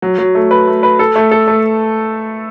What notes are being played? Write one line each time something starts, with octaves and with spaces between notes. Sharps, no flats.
F#3
F#3
A3
B4
A3
B4
A4
A3
A4
A3